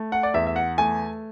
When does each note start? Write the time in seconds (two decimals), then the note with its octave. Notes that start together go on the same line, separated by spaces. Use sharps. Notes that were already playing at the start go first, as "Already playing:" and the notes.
Already playing: A3
0.12 F#5
0.23 D5
0.34 E2 E5
0.47 E5
0.56 F#5
0.78 A3 G#5